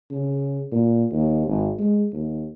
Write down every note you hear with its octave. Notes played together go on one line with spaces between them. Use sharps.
C#3
A#2
D#2
G#1
G#3
D#2